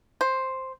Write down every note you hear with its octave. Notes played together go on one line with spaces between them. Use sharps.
C5